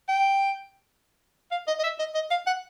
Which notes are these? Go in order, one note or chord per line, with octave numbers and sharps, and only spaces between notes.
G5
F5
D#5
D#5
E5
D#5
D#5
F5
F#5